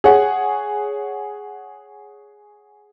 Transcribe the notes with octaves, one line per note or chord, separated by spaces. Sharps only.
G#4 C#5 F#5